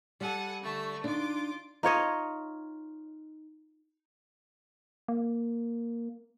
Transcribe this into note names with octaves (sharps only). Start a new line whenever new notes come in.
G3 A4 F#5 G#5
D3 A3 C#6
D4 D#4 F4 D6
D#4 F4 C#5 D#5
A#3